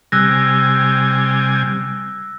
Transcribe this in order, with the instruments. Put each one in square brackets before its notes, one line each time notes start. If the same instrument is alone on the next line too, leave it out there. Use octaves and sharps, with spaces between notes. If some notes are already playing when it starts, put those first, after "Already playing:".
[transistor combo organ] C3 G3 G#5 [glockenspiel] E6 F#6 A#6